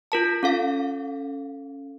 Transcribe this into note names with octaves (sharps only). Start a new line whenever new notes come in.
F4 A#4 A5
C#4 A4 F5